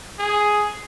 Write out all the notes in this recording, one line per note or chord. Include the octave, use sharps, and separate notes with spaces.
G#4